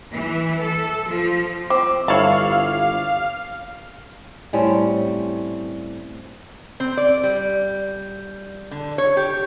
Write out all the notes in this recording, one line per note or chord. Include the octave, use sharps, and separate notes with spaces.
E3
A4
F3
C4 D6
G1 E4 C#5 F5 A5
A2 G3 C4 C#4
C4
D5
G3
D3
C#5
G4